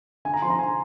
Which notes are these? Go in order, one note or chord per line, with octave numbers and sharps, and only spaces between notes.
D3 G#5
A#5
F3 C4 F4 C6
A#5
D3 G#5